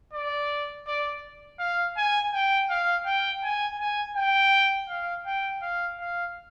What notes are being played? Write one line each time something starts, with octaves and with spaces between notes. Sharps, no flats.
D5
D5
F5
G#5
G5
F5
G5
G#5
G#5
G5
F5
G5
F5
F5